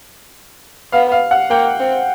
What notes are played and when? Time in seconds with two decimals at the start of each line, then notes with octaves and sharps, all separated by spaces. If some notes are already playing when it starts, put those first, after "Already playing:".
0.92 B3 F5
1.12 F5
1.31 F#5
1.50 A#3 G5
1.80 C4